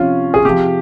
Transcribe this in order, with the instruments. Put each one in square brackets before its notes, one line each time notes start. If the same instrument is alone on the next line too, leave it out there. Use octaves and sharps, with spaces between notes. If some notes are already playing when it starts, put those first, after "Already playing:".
Already playing: [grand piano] C3 F3 C#4 F4
G#4
C3 F3 G4